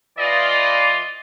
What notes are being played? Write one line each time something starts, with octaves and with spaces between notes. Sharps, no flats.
E3 F4 D5 D#5